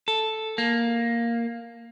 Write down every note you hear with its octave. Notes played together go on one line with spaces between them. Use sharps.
A4
A#3